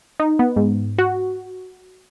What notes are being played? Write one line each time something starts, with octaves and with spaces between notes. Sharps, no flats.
D#4
B3
G#2
F#4